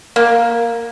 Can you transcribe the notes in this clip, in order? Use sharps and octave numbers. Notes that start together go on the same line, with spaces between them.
A#3